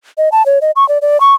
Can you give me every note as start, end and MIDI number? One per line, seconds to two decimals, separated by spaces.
0.18 0.29 75
0.32 0.45 81
0.46 0.59 73
0.61 0.71 75
0.76 0.87 85
0.89 0.98 74
1.02 1.20 74
1.20 1.35 85